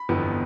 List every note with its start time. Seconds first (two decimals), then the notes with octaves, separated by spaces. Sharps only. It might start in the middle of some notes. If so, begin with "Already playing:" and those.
Already playing: B5
0.09 G1 F2 E3 B3